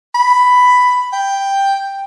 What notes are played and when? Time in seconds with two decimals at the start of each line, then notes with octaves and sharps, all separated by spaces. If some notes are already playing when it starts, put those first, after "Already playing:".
0.15 B5
1.13 G5